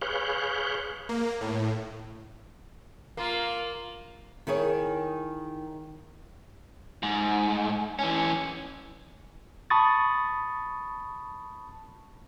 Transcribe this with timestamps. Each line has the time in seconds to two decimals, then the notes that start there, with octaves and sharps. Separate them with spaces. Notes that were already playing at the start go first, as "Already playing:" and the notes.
0.02 G#4 B4 C#5 F5 F#6 G6
1.09 A#3
1.41 A2
3.17 A#3 F4
4.47 D#3 E4 G#4 C#5
7.03 G#2
7.99 E3 C#4
9.70 A5 B5 C#6 D#6 A6